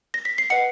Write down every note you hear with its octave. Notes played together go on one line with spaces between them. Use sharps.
A#6
B6
C7
B4 D#5 F#5 C#7